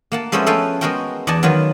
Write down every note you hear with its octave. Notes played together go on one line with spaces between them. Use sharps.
A#3 F#5 A5
F3 G#3 A3 B3 C#4 C5
A4 B4 F5 G5 G#5
G#3 B3 F#4 A#4 C5 G5
E2 D5 D#5 F#5 G#5 A5
D#3 F#3 B3 F4 B4